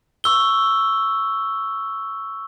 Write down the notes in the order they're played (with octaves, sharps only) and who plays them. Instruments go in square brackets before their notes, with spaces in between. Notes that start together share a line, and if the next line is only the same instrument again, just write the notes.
[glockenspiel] C#6 E6 G7